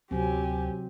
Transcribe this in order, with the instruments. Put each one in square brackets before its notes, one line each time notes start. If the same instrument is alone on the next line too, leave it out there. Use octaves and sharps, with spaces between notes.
[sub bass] D2 [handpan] C3 F#3 C4 [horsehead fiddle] G4 G#5